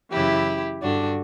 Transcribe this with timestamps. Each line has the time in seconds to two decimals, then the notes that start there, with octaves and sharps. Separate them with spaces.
0.11 F#2 C#3 E3 E4 G4
0.81 G2 D3 D4 F#4